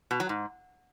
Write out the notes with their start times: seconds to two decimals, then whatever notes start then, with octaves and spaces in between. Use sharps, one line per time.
0.11 B2
0.20 F#3
0.29 G#2